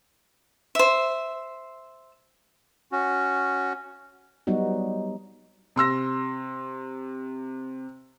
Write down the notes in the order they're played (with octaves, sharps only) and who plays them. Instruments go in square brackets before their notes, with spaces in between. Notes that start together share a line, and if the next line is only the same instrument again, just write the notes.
[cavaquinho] C5 E5
[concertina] C#4 F#4
[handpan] F#3 G3 B3 D#4 F#4
[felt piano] C3 C6 E6 A#6